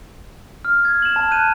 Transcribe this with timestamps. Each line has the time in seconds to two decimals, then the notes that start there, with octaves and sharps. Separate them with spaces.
0.65 F6
0.85 G#6
1.02 E7 F#7
1.16 A5
1.31 F#6 G6 D#7